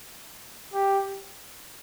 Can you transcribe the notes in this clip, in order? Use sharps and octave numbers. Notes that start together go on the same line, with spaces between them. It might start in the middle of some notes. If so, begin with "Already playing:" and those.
G4